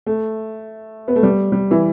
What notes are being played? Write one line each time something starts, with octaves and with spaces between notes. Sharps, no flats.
A3
B3
A3
G3
G3
E3